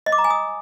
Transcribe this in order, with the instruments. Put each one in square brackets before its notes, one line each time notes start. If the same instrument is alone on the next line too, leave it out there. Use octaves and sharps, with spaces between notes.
[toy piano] D#5
D6
A#5
G#5
D#6